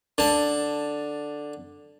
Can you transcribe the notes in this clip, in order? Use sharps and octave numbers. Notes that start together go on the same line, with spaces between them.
D3 A5